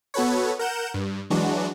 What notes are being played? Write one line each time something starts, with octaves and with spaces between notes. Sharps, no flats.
B3 F#4 A4 B4 C#5
A#4 F#5 G6 E7
G2
E3 F#3 G#3 D4 F#4